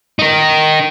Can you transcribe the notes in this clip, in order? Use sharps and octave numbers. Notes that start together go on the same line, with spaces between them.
D#4 A#4